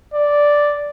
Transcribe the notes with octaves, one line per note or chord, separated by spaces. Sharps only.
D5